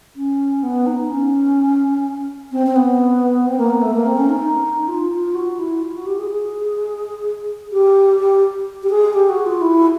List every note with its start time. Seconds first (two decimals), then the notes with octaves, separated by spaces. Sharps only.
0.16 C#4
0.63 B3
0.86 D#4
1.10 C#4
2.52 C4
2.66 C4
2.76 B3
3.46 C4
3.58 A#3
3.70 B3
3.82 A3
3.94 A#3
4.06 C4
4.17 C#4
4.29 D#4
4.88 F4
5.11 F4
5.35 F#4
5.59 E4
5.82 F4
5.94 F#4
6.06 G4
6.19 G#4
6.30 G#4
7.72 G4
8.19 G4
8.83 G4
8.90 G#4
9.14 G4
9.29 F#4
9.46 F4
9.61 E4